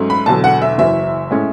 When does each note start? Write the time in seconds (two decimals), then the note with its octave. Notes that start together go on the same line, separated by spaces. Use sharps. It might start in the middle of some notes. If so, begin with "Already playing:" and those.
Already playing: G#2 F#3 A3 C#4
0.10 B5
0.26 E1 E2 D3 F#3 A5
0.44 F#5
0.62 E5
0.78 F#1 F#2 E3 E5
1.31 A2 G#3 C#4